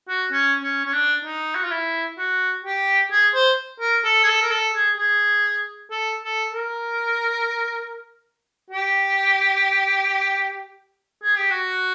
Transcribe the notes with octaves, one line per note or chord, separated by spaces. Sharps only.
F#4
C#4
C#4
C#4
D4
D#4
F#4
F4
E4
F#4
G4
G#4
C5
A#4
A4
G#4
A4
A#4
A4
G#4
G#4
A4
A4
A#4
G4
G#4
G4
F#4